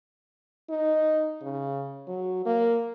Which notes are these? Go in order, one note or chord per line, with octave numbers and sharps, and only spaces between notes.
D#4
C#3
F#3
A#3